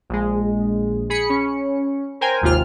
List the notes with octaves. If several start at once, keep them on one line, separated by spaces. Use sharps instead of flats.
A#1 G#3
G#4 B5 C#7
C#4
A#4 C5 G5 G#5
G#1 D#2 C3 F4 F6